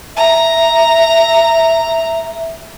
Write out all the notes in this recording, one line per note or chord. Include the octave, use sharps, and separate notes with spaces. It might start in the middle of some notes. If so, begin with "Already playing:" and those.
E5 A#5